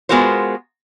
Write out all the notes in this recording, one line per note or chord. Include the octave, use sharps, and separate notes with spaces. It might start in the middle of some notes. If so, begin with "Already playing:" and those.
G#3 B3 F4 F#4 A#4 C5